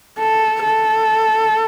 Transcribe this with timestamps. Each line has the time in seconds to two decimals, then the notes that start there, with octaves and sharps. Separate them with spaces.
0.19 A4
0.64 A4